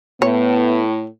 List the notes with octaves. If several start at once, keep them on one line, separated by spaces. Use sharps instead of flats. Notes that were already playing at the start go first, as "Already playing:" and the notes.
A2 B3 C#5